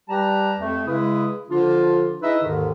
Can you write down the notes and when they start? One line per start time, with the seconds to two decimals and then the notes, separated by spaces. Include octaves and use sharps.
0.09 G3 G4 B4 A5 A#5
0.60 F2 A3
0.86 C#3 G#3 E4 G#4 B4
1.49 D3 F3 D4 F4
2.22 D#4 E4 G#4 B4 D#5 E5
2.42 D#2 G#2 D3 D#3